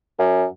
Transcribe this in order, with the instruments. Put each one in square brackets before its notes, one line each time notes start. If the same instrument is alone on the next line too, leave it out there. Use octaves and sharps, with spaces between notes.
[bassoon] F#2